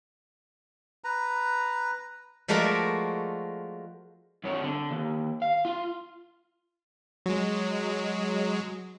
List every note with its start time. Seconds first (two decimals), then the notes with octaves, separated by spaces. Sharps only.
1.04 B4 A#5
2.48 F3 G#3 A3 F#4 A#4 D5
4.44 G2 C#5
4.62 D3
4.91 D#2
5.42 F5
5.65 F4
7.26 F#3 G#3